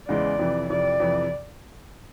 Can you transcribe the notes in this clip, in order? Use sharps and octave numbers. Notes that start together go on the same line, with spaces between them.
E2 C#3 E3 G#3 D5
F2 C3 E3
F2 C3 E3 D5
F2 C3 E3